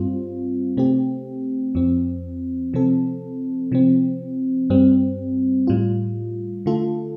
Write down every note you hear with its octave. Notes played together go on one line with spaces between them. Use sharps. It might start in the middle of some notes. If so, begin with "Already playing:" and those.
Already playing: G2 G3 C4 F4
C3 A3 C4 G4
F2 F3 C4
C3 F3 C4 A4
C3 F3 C4
G2 G3 C4
A2 G3 F4
D3 A3 F4 A4